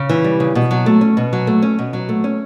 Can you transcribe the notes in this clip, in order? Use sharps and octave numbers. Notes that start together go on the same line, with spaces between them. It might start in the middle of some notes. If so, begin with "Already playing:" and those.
Already playing: C#3
E3
G3
C#3
B2
F#3
A3
C#4
B2
F#3
A3
C#4
B2
F#3
A3
C#4